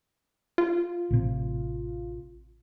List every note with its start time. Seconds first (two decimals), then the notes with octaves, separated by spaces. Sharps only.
0.58 F4
1.10 A1 C3